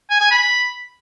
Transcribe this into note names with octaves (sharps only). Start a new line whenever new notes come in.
G#5
G#5
B5